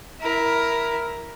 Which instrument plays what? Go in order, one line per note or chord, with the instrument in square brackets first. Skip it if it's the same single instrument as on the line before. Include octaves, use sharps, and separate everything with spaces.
[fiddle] E4 A#4